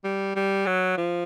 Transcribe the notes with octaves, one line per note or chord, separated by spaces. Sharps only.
G3
G3
F#3
F3